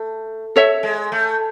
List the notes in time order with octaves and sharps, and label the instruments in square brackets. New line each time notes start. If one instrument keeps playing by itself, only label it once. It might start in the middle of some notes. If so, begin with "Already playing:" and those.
Already playing: [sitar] A3
[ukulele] A4 C#5 E5
[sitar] G#3
A3